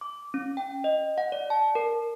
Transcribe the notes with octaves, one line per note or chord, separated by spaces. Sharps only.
D6
C#4
G5
D#5
F#5
D5
A5
A#4